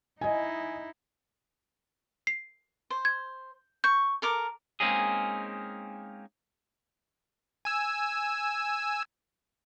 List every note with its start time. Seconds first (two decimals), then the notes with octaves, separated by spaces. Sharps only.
0.21 D#4 E4 D#5 G#5
2.27 C7
2.90 C5
3.05 G#6
3.84 C#6 G6
4.22 A4 A#4 D6
4.80 G#3 A#3 C4 C#4 D#4 G#4
7.65 G#5 E6